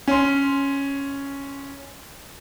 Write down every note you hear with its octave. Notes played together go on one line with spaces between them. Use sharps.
C#4 C6